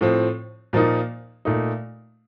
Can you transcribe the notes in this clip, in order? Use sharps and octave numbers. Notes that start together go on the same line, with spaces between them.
A2 F3 C4
A#2 F3 A#3 D#4
A#2 A3 D#4